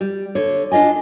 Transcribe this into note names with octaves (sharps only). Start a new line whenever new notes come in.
G3
D3 C#5
D4 F4 D#5 G#5